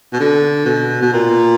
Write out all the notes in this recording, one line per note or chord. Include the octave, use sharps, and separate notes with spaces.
B2
D3
B2
B2
A#2